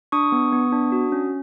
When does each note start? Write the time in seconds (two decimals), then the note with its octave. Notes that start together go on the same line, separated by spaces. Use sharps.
0.12 D4 C#6 D#6
0.32 B3
0.53 B3
0.72 D4
0.92 F#4
1.12 C#4